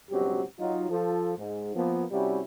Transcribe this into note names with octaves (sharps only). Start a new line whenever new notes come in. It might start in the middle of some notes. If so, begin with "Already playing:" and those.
C#2 G2 B2 F#3 C4 G4
F#3 D#4 F4
F3 F4 A4
G#2
F3 A#3 B3
C3 G3 C#4 E4 F#4